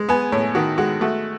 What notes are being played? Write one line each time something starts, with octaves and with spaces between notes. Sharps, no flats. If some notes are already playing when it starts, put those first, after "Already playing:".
Already playing: G#3
B3 G#5
A2 C#5
D#3 F#4
G#3 F#4
A3 F#4